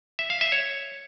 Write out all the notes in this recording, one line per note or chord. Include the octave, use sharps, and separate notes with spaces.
E5
F5
E5
C#5